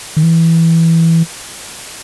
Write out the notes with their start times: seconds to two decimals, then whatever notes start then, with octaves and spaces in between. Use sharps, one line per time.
0.17 D#3
0.23 E3